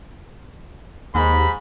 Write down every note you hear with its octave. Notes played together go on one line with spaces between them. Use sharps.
D#2 G#2 B5